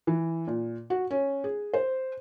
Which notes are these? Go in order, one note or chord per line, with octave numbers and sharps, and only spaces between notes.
E3
A#2
F#4
C#4
G#4
C5